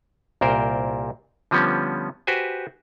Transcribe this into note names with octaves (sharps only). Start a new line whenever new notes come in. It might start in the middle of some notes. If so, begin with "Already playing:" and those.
C2 A#2 A#4 C5 G5
D3 F3 G3 B3 C#4
F#4 G4 B4 C5 G#5